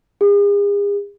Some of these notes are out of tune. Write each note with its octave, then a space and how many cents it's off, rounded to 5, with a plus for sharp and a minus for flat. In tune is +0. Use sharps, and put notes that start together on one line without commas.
G#4 -40